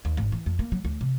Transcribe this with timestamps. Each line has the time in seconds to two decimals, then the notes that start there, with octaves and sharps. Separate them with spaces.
0.05 D#2
0.17 G#1
0.32 E3
0.46 F2
0.59 A#3
0.72 F#3
0.85 D2
1.01 C3